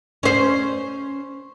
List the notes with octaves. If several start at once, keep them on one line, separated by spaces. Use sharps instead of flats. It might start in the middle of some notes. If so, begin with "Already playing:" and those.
C#4 C5